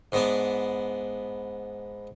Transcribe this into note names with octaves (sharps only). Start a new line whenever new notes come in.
G#2 B3 D4